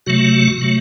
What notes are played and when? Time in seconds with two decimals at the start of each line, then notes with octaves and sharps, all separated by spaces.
0.06 C3 F#3 A3 F#4
0.58 C3 F#3 A3